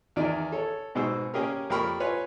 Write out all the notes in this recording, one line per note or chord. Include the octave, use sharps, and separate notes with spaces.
E2 D#3 D5
A4 C#5
G#2 B2 G#4 C5 E6
A#3 C#4 G4 G#4 A#4
F2 A#3 G4 A#4 B5 C#6
F4 B4 C#5 G#5